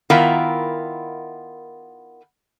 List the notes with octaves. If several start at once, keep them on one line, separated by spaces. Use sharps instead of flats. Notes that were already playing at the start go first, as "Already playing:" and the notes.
D#3 B3 E4 F4 A#4 E5